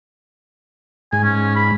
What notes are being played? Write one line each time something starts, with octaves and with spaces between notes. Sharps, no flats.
G#2 G#5
C#4
B5